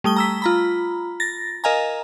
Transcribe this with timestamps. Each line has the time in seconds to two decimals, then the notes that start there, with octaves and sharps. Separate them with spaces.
0.04 G3 A3 D#6 G7
0.16 A#5 E6 B6
0.42 F4 A#5 B5
1.20 A6 A#6
1.64 A#4 D#5 F5 G#5 A#5